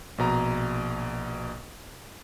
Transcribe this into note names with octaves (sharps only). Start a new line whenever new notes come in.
A#1 B2 A#5